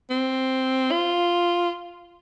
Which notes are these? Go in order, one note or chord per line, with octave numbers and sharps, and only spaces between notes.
C4
F4